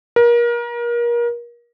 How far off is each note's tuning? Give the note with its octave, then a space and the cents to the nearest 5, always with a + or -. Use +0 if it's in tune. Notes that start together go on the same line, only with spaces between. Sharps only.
A#4 +30